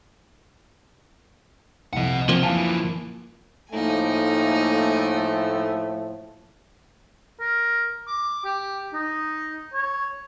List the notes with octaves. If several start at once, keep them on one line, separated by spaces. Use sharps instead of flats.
C2 F2 D#5 F#5
C3 F3 A#3 C4
F#2 E3 F5 G#5 A5
A2 F3 A3 A#3 D#4 G#5
A#4
D6
G4
D#4
C#5